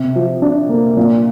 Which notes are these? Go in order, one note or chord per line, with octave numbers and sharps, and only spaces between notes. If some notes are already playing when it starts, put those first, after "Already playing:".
Already playing: C3
F3
D4
A#3
A#2